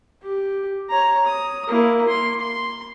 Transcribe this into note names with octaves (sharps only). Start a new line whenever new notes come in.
G4
C#5 A#5
D#6
A#3 E4
C6
C6